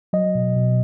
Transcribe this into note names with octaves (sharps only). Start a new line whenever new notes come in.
F#3 D#5
B2
B2